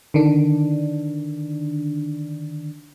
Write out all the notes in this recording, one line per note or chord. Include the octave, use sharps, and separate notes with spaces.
D3 D#3 D4